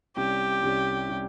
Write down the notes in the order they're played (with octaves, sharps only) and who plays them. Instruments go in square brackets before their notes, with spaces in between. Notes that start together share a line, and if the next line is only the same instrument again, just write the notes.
[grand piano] C2 C3 G3 C#4 [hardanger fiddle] G4
[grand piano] C2 C3 G3 C#4
C3 G3 C#4